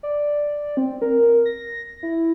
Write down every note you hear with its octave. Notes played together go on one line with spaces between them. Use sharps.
D5
C4
A#4
A#6
E4